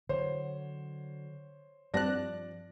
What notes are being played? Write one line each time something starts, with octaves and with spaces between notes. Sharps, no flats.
D3 F#3 C5 C#5
G2 F3 C4 D5 A5 F#6 A#6